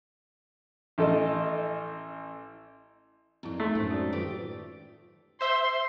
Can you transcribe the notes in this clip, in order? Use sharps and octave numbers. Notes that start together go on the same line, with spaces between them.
A1 A4 D#5
F2 A#2 C4 E4
A3 D#4 C6
F#2 A2 G#3 D#4 C5
F#4 D5
D#3 F4 G4 B4
C5 E5 C6